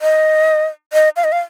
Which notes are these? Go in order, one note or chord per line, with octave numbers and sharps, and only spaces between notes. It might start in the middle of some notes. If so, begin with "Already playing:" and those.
D#5
D#5
F5
D#5
F5